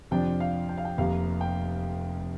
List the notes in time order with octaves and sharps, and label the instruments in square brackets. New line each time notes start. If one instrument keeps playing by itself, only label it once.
[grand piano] F2 C3 F3 D4 G5
F5
G5
F5
G5
F1 F2 C3 A#3 F5
G5